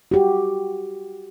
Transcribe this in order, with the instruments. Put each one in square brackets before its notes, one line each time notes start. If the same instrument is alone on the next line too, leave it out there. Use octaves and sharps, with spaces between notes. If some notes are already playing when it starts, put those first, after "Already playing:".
[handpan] F#4 G4